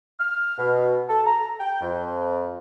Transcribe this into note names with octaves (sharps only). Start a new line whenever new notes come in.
F6
B2
A4
A#5
G5
F2